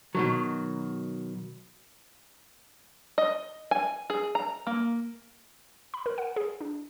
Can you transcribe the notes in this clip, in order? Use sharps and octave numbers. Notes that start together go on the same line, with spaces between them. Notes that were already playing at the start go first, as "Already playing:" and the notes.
B2 D#3 F#3
D#5
G#5
G#4
A#5
A#3
B5
A#4
F#5
G#4
D4